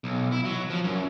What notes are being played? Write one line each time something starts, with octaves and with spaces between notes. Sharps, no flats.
B1
E4
F#3
F3
F#2